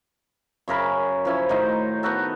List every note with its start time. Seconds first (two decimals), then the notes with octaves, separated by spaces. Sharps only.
0.68 F#2 C#3 A#4 B5
1.25 F3 C#4 E4
1.49 A2 D#3 D#4 C5
2.03 B3 D#4 F#4 A4